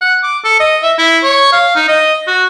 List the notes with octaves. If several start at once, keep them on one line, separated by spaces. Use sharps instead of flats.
F#5
D6
A4
D#5
E5
E4
C#5
F5
D#4
D#5
F#4